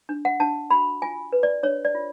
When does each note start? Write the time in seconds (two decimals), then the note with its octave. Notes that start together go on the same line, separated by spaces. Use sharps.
0.09 D4
0.25 F#5
0.40 D4 A5
0.70 F#4 B5
1.02 F4 G#5
1.32 B4
1.43 D5
1.63 D4 C#5
1.85 D5
1.95 F4